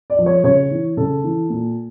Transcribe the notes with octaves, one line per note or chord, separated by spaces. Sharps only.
D5
F3
C#5
C#3 C#5
E3
C#3 A4
E3
A#2